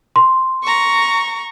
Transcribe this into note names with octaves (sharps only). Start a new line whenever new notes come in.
C6
A#5 C#6